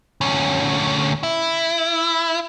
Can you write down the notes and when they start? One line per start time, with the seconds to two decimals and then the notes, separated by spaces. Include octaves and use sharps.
0.21 D2 C#4
1.23 E4